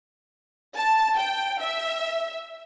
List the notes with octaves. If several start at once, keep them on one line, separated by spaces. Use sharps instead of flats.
A5
G5
E5